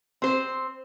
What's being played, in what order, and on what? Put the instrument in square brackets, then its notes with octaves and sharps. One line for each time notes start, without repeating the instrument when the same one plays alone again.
[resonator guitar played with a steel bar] C4 C5